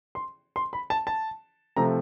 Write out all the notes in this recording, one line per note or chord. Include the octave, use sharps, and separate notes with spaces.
C6
C6
B5
A5
A5
C3 F3 A3 A#5